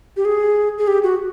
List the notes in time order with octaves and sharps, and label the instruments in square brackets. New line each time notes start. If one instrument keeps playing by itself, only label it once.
[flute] G4
G#4
G#4
G4
F#4